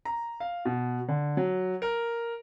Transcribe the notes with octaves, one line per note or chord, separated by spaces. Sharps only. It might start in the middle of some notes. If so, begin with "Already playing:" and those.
A#5
F5
B2
D3
F#3
A#4